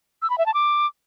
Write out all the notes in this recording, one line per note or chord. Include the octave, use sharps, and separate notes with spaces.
E6
B5
E5
A5
D6